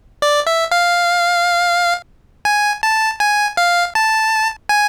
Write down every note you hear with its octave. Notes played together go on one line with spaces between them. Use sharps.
D5
E5
F5
G#5
A5
G#5
F5
A5
G#5